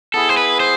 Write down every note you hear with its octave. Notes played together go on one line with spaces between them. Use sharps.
B3 E4 G#4 A4
C5
B4
C5